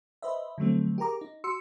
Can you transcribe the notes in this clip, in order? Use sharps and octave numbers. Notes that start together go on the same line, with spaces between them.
B4 C5 D#5 E5
D3 F3 F#3 A3 C4
G4 G#4 A#4 A#5 D6
D#4
F#4 C6 E6 C#7